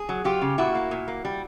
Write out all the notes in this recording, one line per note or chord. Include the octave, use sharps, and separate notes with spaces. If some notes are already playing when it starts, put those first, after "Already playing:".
Already playing: G#4
F#3
F#3 F4 G4
C#3
A#2 E4 F#4
A#3
A#2
A#3
G3